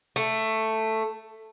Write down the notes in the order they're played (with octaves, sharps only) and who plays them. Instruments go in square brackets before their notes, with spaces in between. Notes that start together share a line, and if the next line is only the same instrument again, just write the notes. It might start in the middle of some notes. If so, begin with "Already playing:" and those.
[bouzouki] A3